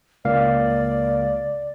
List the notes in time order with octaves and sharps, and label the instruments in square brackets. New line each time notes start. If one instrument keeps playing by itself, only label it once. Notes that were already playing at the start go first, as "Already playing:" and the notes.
[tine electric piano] C#2 A#3 F5 [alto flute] D5